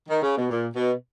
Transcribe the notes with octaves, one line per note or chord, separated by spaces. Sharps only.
D#3
C#3
B2
A#2
B2